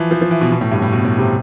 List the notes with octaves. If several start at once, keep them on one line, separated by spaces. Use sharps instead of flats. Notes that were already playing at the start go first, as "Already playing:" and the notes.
Already playing: E3 F3
F3
F3
E3
B2
B2
A2
G2
A2
B2
A2
C3